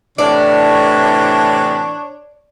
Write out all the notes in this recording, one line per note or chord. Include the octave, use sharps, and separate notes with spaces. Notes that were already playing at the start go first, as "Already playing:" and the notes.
A2 C3 E3 D4 C#5 D5